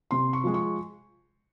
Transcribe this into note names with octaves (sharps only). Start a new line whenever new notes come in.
C3 C6
C#6
F3 G#3
C#6